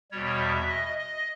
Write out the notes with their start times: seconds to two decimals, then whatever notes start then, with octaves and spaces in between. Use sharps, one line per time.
0.11 E2 B2 G3 C#5
0.40 E5
0.69 D#5
0.98 D#5